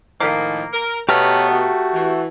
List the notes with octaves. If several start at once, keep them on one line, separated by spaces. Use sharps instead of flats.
A2 D#3 F3 A#3
A#4
B2 A3 B3 G4 C#5 A#5 F6
F#4
E3